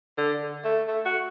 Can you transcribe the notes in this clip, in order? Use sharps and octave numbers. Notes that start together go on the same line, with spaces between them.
D3
A3
A3
F#4